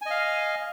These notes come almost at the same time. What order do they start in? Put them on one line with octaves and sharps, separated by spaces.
G#5 D#5 F5